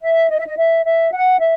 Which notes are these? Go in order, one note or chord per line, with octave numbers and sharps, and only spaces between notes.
E5
D#5
E5
D#5
E5
E5
F#5
E5